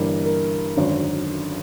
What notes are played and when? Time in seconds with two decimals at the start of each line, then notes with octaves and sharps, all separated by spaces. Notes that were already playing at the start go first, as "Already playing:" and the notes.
Already playing: G1 G2 E3 G3 A#3
0.25 A#4
0.76 G#1 F#2 D3